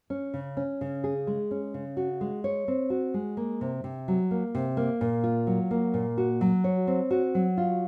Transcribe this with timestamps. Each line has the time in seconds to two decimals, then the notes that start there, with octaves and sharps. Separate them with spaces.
0.10 C#4
0.34 C#3
0.57 C#4
0.81 C#3
1.04 G#4
1.27 G#3
1.51 C#4
1.74 C#3
1.97 F#4
2.21 G#3
2.44 C#5
2.68 C4
2.90 F#4
3.14 G#3
3.37 A#3
3.61 C3
3.84 C3
4.08 F#3
4.31 A#3
4.55 C3
4.77 A#3
5.01 A#2
5.24 F4
5.47 F#3
5.71 A#3
5.94 A#2
6.18 F#4
6.41 F#3
6.64 C#5
6.87 C4
7.11 F#4
7.35 F#3
7.57 F4